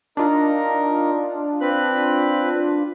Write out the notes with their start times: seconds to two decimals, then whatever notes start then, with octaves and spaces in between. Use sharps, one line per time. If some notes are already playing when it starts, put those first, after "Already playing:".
0.17 D4 D#4 F4 A#4
1.61 C4 B4 F#6